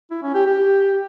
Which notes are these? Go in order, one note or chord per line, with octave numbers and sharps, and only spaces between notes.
E4
C#4
G4
G4